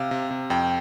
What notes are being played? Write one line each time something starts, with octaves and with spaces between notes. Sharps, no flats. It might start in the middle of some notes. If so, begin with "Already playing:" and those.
Already playing: C3 F5
C3
C3
F2 G5